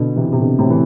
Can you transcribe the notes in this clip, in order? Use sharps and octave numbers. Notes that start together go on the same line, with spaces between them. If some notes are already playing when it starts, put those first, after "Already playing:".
Already playing: B2 D3
C3 E3
B2
C3
B2 D3
A2 C3
E3